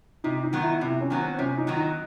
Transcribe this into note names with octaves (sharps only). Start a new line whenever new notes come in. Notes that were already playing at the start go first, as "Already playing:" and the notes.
C3 D#4
D#4
D#3 F#3 B3
E4
C3 E4
C#4
D#3 F#3 B3
C4
C3 C#4
D#4
D#3 F#3 B3
D#4